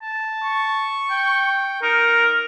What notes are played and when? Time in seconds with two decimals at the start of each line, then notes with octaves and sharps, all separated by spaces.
0.03 A5
0.43 C#6
1.11 G5
1.83 D#4 A#4